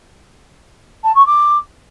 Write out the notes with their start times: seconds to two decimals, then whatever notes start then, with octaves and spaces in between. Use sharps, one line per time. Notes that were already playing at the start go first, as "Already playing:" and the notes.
1.04 A5
1.15 C#6
1.26 D6